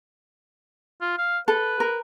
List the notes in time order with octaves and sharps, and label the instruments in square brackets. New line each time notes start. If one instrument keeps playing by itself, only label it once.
[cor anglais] F4
F5
[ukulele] A4 [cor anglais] B4
[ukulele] A#4